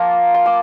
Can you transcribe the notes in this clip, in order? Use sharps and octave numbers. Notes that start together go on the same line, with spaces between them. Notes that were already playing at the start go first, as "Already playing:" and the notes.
Already playing: F3 A#3 F4 A#5 C6
C6
D6